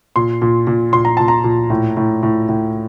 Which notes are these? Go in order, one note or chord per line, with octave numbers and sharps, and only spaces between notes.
A#2 C6
A#2
A#2
A#2 C6
A#5
A#2 A5
A#5
A#2
A2
A2
A2
A2